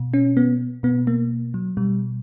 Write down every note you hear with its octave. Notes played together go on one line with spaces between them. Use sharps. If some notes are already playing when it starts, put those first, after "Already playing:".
Already playing: B2
C#4
B3
B2 B3
A#3
F#3
B2 G3